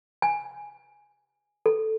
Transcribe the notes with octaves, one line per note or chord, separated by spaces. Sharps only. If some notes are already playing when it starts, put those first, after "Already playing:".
G#5
A4